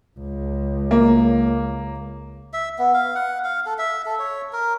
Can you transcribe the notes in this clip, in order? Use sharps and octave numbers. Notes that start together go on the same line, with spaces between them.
C#2
A#3
E5
B3
F5
F#5
F5
A4
E5
A4
C#5
A#4